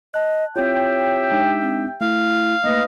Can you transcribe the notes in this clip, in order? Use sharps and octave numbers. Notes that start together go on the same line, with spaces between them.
D#5 A5 F#6
C4 E4 F4 G4 C#5 E5 G5
G#3 D4 D#4
C4
A3 E4 F5
A3 A#3 D#4 B4 D#5